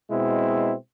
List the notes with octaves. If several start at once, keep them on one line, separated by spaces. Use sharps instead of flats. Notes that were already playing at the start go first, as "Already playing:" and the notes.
B2 G#3 C4 E4